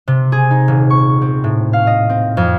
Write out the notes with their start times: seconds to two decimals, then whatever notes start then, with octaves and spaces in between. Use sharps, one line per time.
0.08 C3
0.32 G#4
0.51 D#4
0.68 D#1
0.90 C#6
1.21 C4
1.44 A2
1.73 F5
1.87 D#5
2.09 C4
2.37 F2